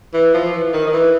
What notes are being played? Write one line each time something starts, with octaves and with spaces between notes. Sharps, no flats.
E3
F3
E3
D#3
D#3
E3